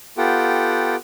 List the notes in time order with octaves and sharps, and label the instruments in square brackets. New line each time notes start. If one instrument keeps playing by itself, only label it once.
[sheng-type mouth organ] B3 F4 G4 A4 F#5 G5